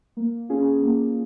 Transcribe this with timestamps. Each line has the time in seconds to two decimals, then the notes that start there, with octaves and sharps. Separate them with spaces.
0.17 A#3
0.49 C#4 F4 G#4
0.82 A#3